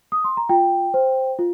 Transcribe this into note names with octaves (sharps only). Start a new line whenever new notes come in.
D#6
C6
A#5
F4 G5
C5
F4